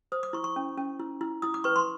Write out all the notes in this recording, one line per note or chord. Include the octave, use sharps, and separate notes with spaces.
C5 D#6
D6
E4 C#6
C#6
C#4
C#4
E4
E4
E4 D#6
D6
B4 C#6
C6